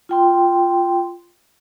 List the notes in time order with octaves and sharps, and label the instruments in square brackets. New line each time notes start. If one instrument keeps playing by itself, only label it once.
[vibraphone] F4 G5 C6